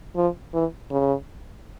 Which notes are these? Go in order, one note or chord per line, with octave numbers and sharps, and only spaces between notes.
F3
E3
C#3